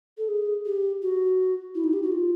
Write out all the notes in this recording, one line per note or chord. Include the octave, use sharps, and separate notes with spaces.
A4
G#4
G4
F#4
E4
D#4
G4
F#4
F4